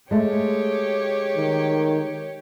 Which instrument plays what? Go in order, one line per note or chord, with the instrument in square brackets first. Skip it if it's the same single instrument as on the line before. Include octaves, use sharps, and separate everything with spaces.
[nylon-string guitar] G#3 A3 [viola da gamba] G4 C#5
[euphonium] D#3